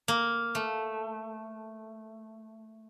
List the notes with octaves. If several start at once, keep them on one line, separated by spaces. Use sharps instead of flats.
A#3
A3